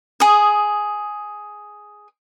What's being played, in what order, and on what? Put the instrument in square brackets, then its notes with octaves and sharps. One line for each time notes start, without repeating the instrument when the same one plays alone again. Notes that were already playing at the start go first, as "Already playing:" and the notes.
[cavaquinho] G#4 D#6